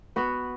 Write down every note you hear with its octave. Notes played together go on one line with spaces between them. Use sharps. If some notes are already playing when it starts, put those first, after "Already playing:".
B3 F#4 B4